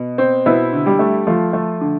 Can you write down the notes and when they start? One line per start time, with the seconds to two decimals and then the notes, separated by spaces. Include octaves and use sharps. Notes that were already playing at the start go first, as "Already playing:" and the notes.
Already playing: B2
0.18 C4
0.46 B2 B3 E4
0.73 D3
0.86 G3 G4
0.99 A3
1.27 F3 A3 F4
1.53 A3
1.81 D3